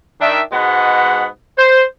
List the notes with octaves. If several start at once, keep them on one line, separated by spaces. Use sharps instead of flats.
D#3 D4 E5
G#2 B2 G#3 B3 F#5 B5
C5